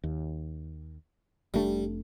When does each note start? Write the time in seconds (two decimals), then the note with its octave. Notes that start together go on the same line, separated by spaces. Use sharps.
0.03 D#2
1.54 F1 G3 A3 D4